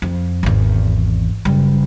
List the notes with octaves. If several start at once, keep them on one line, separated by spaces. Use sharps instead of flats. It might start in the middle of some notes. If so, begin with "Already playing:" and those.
F2
G#1 E2
F#1 G3